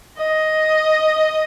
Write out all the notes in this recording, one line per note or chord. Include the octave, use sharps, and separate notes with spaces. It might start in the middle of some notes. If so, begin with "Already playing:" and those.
D#5